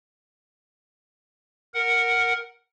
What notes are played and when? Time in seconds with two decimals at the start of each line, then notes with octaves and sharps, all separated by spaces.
1.74 A#4 F#5